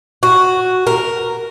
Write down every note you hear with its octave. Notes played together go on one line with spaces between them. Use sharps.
F#4
A#4